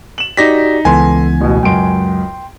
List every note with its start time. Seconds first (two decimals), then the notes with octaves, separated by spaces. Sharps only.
0.18 E7 F#7
0.37 D#4 F#4 G4 D5 A#6 B6
0.85 C#2 E3 B3 A4 G#5 C6
1.41 A1 B2
1.63 C#2 F#2 G5 C6 D7